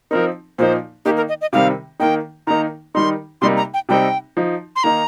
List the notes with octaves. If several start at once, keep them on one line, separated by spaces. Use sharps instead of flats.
F3 C4 D#4 A#4
A#2 F3 A#3 D#4 C5
D#3 A#3 D#4 G4
A#4
D#5
D#5
C3 D#3 G3 C4 F5
D#3 A#3 D#4 G5
D#3 A#3 D#4 A#5
D#3 G3 D#4 C6
C3 G3 A#3 D#4 C6
A#5
G5
C3 G3 C4 D#4 G5
F3 D#4
C6
D#3 A#3 D#4 A#5